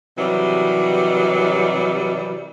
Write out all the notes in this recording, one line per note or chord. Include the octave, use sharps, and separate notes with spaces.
C3 D#3 E3 F#3 G3